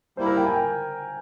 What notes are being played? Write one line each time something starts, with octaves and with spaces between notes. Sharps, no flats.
G3 A#3 E4 C5
A#4
G5
G#5
G5